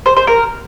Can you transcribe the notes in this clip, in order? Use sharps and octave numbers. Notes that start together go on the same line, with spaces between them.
C5
C5
A#4